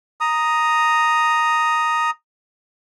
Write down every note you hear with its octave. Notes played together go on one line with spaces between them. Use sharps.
A#5 D#6